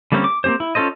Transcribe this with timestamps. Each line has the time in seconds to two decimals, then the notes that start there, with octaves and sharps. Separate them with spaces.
0.12 D3 G3 A#3 C4 C#4
0.24 D6
0.44 A#3 C4 C#4 G4 C5
0.60 E4
0.75 C#4 F4 A4 C5 D#5